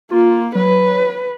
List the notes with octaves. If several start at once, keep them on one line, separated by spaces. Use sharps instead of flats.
A#3 F4
F#3 B4